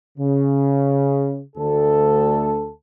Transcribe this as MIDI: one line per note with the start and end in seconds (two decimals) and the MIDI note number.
0.18 1.40 49
1.56 2.70 38
1.56 2.70 69